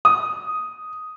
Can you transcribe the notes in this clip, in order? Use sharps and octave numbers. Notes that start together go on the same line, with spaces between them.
D#6